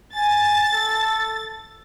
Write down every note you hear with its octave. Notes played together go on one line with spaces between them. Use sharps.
G#5 A6
A4